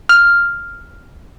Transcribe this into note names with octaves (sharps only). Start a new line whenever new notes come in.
F6